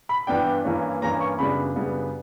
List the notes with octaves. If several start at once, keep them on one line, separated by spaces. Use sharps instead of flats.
B5
G2 E3 B3 D4 G5
G2 E3 A#3 C#4
G2 E3 A#3 C#4 A#5
C#6
F#2 C#3 G3 B3 D4 B5
F#2 C#3 G3 B3 D4